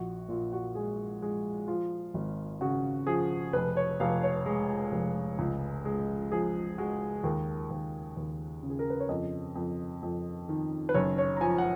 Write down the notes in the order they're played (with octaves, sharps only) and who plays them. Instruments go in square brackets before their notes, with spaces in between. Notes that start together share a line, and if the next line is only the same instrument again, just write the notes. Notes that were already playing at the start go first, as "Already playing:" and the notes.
Already playing: [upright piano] A#1 F#4
A#2 F4
F#4
G#3 G#4
G#3
F3 F4
G#1
C#3 F#4
F3 G#4
F1 B4
C#5
F1 F5
C#5
G#3
F1
C#2
G#3
F3 G#4
G#3 F#4
D#2 A#4
D#2
D#2
C#3
G#4
A#4
B4
C#5
F2 D#5
F2
F2
D#3
B4
F#1 C#5
C#5
A#5
F3 G#5
F#5